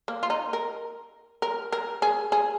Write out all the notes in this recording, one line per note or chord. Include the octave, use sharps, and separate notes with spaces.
A#3
F4
D#4
A#4
A#4
A#4
G#4
G#4